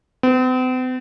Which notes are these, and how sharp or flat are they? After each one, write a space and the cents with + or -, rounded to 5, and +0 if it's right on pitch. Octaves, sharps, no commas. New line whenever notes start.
C4 -45